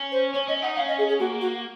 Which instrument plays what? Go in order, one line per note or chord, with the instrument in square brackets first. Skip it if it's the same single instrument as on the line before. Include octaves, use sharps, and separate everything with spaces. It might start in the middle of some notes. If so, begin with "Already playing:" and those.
Already playing: [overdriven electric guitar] C#4
[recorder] C5
[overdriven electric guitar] C#4 [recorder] C#5
[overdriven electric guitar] C#4 [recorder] D#5
[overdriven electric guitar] D#4 [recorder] F#5
[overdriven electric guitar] C#4 [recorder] F5
[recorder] D#5
G#4
G#4
[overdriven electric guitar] A#3 [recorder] F#4
[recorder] F#4